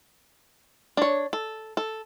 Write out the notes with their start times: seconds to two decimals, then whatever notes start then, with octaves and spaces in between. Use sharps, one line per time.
0.97 D4 C#5
1.33 A4
1.77 A4